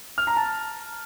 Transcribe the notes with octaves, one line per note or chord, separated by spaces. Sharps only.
F6
A#5
A5